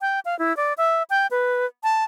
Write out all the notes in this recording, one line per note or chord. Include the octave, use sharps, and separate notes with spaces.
G5
F5
E4
D5
E5
G5
B4
A5